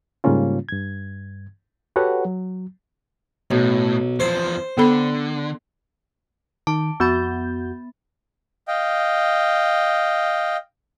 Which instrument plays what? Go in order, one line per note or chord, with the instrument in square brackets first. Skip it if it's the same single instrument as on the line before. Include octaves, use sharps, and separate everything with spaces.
[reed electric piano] G#2 C#3 G3 A#3 C#4 F4
G2 G#6
F#4 G4 A4 B4 C#5 F#5
F#3
[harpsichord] B1 [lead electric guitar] A2
[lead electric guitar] E2 F3 [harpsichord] C5
[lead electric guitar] D3 [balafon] B3 A4 B5
[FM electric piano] D#3 [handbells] A5 D6
[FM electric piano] F2 F#4 G6 [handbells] B3 B5 A6
[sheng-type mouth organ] D#5 F5 G5